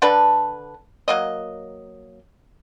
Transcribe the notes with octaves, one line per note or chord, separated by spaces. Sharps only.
D3 D4 A4 B4
F#3 A#3 D#5